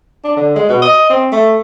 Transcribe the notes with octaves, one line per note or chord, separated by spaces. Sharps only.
D4
D3
G#3
B2
D#5
C4
A3